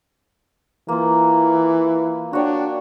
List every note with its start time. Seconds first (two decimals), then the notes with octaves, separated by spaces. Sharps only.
0.88 E3 A#3 F4
2.33 D4 F#4 C#5 G5